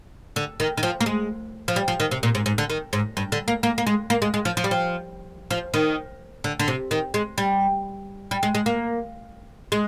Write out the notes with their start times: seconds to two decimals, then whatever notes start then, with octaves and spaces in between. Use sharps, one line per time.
0.36 D3
0.60 D#3
0.77 D#3
0.83 F3
1.01 A#3
1.06 G#3
1.68 F3
1.76 G3
1.88 F3
2.00 D#3
2.11 C3
2.23 A#2
2.35 G#2
2.46 G#2
2.58 D3
2.70 D#3
2.93 G#2
3.17 G2
3.32 D3
3.48 A#3
3.63 A#3
3.78 A#3
3.87 G#3
4.10 A#3
4.22 G#3
4.34 G#3
4.45 F3
4.57 F3
4.64 G3
4.71 F3
5.51 F3
5.74 D#3
6.44 D3
6.60 D3
6.68 C3
6.91 D#3
7.14 G#3
7.38 G3
8.31 G3
8.43 G#3
8.55 G#3
8.66 A#3
9.72 G#3